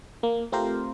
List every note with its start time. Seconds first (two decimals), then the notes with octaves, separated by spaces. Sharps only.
0.23 A#3
0.52 A3 C4 F4 G4 A#4 C5